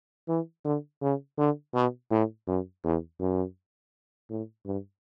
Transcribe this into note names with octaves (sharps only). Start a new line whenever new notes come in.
E3
D3
C#3
D3
B2
A2
F#2
E2
F#2
A2
G2